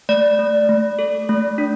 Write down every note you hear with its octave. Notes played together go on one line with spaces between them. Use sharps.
A3 D5
A3
A3
A4
A3
D4